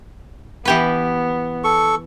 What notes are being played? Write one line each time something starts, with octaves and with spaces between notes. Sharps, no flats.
E3 B3 G4 B4
A4 C#6